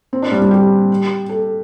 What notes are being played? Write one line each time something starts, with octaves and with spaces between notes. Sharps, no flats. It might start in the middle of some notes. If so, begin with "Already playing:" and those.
C4
D4
G3
G3
G4
A4